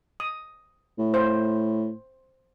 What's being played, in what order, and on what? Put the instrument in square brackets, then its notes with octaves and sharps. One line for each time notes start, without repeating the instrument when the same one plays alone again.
[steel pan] D#6
[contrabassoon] A2
[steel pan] C5